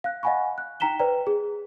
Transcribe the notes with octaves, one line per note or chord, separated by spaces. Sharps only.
F5 F#6
D#5 F5 F#5 G#5 B5 C#6
F#6
D#4 G5 A#5 B6 E7 G7
B4 C5 D5 G5 A#5
G#4